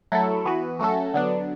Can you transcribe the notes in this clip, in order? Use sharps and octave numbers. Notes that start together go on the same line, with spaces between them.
F#3 A3 E4 A4
E3 B3 F#4 B4
F#3 A3 C#4 F#4 A4
D3 F#3 B3 D4